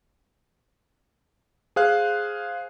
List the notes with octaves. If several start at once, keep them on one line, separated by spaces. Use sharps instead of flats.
G#4 C5 F5 F#6